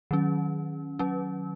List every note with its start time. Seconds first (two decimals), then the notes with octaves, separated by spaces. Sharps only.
0.11 D#3 F#3 C#4
0.99 F#3 C#4